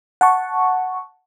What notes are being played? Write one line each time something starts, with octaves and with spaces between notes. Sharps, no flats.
F#5 A5 C#6